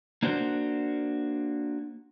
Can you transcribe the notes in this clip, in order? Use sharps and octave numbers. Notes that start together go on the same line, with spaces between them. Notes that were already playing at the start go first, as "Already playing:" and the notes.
A#3 D4 F#4 C5